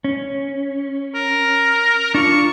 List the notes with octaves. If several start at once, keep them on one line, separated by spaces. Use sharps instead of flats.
C#4
A#4
D4 F4 C#6